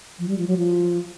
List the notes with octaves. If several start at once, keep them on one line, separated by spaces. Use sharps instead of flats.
F3
G3
F3
F#3
F3